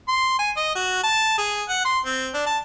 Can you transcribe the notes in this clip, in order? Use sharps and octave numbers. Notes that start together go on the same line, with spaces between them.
C6
G#5
D#5
F#4
A5
G#4
F#5
C6
C4
D4
A5